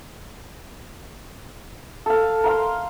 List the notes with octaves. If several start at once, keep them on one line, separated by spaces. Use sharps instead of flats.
A4 F5
A#4 F5 C6